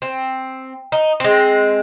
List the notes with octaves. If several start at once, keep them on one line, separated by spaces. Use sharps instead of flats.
C4
D#4
G#3 C4